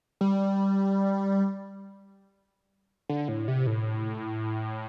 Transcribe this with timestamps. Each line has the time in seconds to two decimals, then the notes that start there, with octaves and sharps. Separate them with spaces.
0.21 G3
3.09 D3
3.28 A2
3.48 C3
3.67 A2